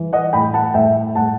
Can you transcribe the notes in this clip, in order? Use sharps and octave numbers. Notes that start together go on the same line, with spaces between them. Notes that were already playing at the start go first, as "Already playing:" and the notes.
Already playing: E3
D#5 F#5
A2 G5 B5
F#5 A5
A2 E5 G5
A2 F#5 A5